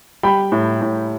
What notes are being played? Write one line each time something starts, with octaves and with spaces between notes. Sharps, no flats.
G3 G5 B5
A2
A2